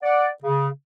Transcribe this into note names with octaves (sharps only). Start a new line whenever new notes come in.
D5 F#5
C#3